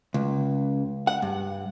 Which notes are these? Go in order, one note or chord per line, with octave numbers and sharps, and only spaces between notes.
C#2
F#5
G2